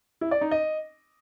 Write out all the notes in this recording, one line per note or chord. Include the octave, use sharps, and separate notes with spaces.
E4
D5
D#4
D#5